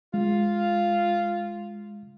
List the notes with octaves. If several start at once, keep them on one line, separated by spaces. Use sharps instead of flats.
G#3 F4